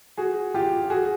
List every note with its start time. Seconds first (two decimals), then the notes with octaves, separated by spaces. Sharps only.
0.17 F#4 G#4
0.54 F4 G4
0.90 F#4 G#4